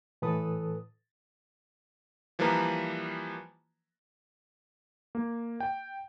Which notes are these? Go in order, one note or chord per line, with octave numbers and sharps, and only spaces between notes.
A2 E3 A4 B4 D#6
E3 F3 G3 A#3 B4 A#5
A#3
G5